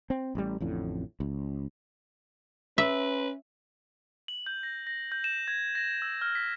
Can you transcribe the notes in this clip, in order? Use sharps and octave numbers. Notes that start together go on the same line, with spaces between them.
C4
A1 G3
A1 F2 A2 D3
C#2
C#4 B4 E5
F#7
G6
A#6
A#6
G6
E7
G#6
A#6
E6
F6
B6